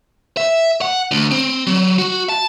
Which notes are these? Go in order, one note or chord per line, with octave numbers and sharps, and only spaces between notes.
E5
F#5
D2
C4
F#3
F#4
A5